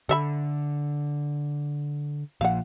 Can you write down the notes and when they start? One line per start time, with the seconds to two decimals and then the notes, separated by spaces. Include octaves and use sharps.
0.09 D3 A4 E5 B5
2.41 A#2 F3 F5 F#5